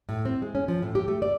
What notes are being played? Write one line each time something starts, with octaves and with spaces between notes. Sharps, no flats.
A2
C4
G#3
C#4
F3
A2
G4
A3
D5